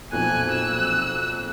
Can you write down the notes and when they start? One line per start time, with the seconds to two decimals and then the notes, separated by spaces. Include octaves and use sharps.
0.12 B1 F2 A#2 G#5 F#6
0.51 E6